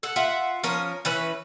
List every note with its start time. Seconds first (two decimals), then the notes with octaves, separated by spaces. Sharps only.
0.03 A4 F#5
0.16 F4 E5 F#5
0.63 F3 C#4 A#4
1.05 E3 C#4 B4